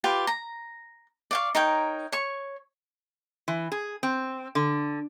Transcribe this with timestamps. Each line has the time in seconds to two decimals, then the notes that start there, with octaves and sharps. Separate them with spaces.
0.04 F4 G4 B4 D5
0.27 A#5
1.31 D5 F5 C#6
1.55 D#4 A#4 C#5 G5
2.12 C#5 C#6
3.48 E3
3.72 G#4
4.03 C4
4.55 D3